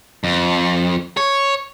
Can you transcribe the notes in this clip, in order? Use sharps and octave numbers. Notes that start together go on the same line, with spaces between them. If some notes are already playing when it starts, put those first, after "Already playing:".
F2
C#5